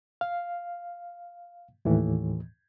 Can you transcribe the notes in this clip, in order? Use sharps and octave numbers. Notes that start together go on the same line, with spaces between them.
F5
D#2 A2 E3